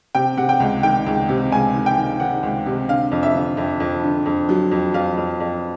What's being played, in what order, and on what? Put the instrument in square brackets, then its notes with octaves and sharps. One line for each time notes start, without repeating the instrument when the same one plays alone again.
[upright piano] C3 G5
C3 F#5
G5
C#2
D#3 G5
C#2
C3
C#2 G#5
D#3
G5
D#3
D#3 F#5
C#2
C3
D3 F5
F2
E5
D3
F2
F2
D3
F2
F#3
F2
F2 F5
F2
F2